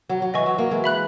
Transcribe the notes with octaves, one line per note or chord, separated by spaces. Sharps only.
F#3
F#3
E3 D#5 G#5 C#6
F#3
F#3 A#3
E3 G#3
E5 B5 F#6